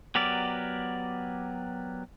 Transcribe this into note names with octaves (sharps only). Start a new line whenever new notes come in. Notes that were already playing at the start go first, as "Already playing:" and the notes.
F#3 B3 G4 A#4 D5